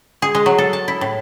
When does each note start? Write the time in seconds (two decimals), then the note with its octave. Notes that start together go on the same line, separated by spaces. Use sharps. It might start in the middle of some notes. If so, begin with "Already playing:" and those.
0.22 G#4
0.35 G#3
0.46 F#3
0.58 A4
0.73 A5
0.88 E4
1.01 A2